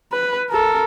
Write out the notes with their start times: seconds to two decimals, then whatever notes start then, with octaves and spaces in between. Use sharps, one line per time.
0.13 B4
0.50 A4 A#4